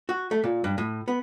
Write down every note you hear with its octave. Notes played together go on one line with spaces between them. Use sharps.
F#4
A3
A#2
G2
A2
B3